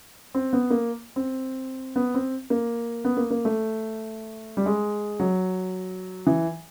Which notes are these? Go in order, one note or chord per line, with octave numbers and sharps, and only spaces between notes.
C4
B3
A#3
C4
B3
C4
A#3
B3
A#3
A#3
A3
G3
G#3
F#3
E3